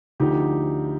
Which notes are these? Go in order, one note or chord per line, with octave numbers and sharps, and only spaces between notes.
D2 D3 F3 D#4 G4